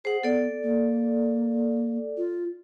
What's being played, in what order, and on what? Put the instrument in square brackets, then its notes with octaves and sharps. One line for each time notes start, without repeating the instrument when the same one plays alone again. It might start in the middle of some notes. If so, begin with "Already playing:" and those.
[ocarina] G#4 [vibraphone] C5 F#5
[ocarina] B3 [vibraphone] A4 D5
[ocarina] A#3
F4